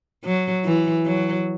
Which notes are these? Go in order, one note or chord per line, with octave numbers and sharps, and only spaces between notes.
F#3
E3
F#3